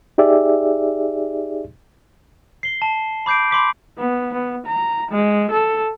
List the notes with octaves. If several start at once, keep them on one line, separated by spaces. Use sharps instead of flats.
D#4 G4 G#4 D5 E5
C7 G7
A5
B5 D6 G6 C7 D7
B5 C6 D6 B6
B3
B3
A#5
G#3
A4